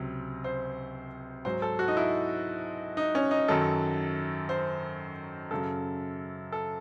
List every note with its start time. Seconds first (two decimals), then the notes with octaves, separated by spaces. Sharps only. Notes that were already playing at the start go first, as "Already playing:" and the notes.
Already playing: C#2 C3 F#3
0.44 C5
1.45 G#2 F#3 C5
1.62 A4
1.79 F#4
1.88 D#4
1.97 E4
2.97 D#4
3.15 C#4
3.31 D#4
3.48 F#2 D#3 F#3 A4
4.49 C5
5.51 F#2 C#3 F#3 A4
6.52 A4